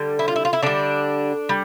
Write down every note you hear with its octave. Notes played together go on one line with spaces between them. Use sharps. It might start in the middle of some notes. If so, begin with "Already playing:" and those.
Already playing: D3 G3
E4
F4
E4
F4
E4
D3 G3 D4
G3